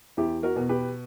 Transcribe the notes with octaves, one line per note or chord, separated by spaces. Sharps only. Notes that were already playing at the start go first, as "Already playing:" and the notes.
E2 E4 G4
F#4 A#4
B2
G4 B4